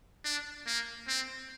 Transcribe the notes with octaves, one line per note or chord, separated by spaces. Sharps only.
D4
A#3
C4